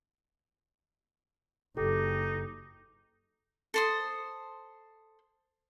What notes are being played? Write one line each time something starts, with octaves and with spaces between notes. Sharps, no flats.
F#1 D#4 G4 A4
A4 C5 D#6